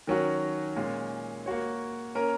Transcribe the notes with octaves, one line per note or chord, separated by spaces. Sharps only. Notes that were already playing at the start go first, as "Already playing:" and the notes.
D#3 F#3 C#4 F#4
A#2 G#3 C#4
A#3 F#4 C#5
A#3 C#4 A#4